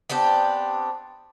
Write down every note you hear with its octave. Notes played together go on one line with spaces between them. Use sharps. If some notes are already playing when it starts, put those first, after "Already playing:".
B3 C4 D4 G4